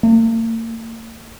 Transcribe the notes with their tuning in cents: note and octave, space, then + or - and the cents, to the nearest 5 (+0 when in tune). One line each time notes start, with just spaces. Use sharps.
A#3 -45